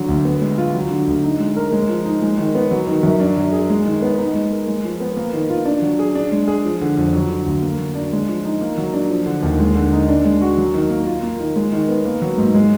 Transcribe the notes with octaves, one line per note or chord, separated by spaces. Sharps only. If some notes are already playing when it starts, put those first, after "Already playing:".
Already playing: D3 F#3
D2
B3
G#3
F4
F#3
D3
D2
D#4
G#3
A#4
G#3
F3
D#4
G#3
D#3
B3
F#3
D#3
F#2
D4
F#3
G#4
G#3
D#3
B3
D#4
G#3
A#4
G#3
F3
B3
A#3
D#3
F4
D4
F#3
G#4
D4
G#3
G#4
F3
D3
F2
F#3
D3
D2
A#3
F#3
D4
G#3
F3
D#4
A#3
F#3
D4
F3
D3
D#2
G#3
D3
D#4
D4
G#3
F#4
F#3
D#3
A#3
F4
A#3
D#3
G#3
D#3
B3
A#3
F#3
G#2
G#3